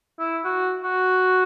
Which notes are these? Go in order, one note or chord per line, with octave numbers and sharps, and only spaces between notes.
E4
F#4
F#4